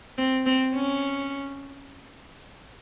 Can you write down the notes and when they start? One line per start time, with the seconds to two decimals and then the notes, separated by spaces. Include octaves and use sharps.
0.18 C4
0.46 C4
0.75 C#4